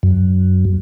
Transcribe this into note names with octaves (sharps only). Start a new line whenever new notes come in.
F#2